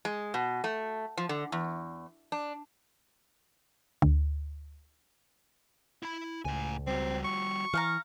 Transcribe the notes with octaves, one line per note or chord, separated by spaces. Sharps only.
G#3
B2
A3
F3
D3
E2
D4
D2
E4 B5
C#2 A2 G#5
G3 C4 F#4
C#6
E3 F5 F#5 A#5